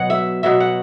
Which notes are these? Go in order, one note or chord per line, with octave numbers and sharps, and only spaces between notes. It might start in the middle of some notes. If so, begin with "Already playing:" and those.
Already playing: B2 F#3 F#5
E5
B2 F#3 E5
F#5